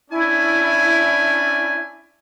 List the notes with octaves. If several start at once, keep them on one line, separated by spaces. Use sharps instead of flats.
C#4 D4 E4 G#5